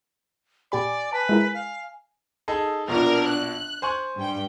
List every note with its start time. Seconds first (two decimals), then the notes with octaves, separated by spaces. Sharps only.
0.72 A#2 G4 D5 G#5 B5
1.13 B4 A5
1.29 G#3 E4 A#4
1.54 F5
2.48 D#4 G#4 A4
2.88 A#1 B2 F3 D4 A#4
3.27 F#6
3.82 C5 G#5 C#6
4.16 G2 G5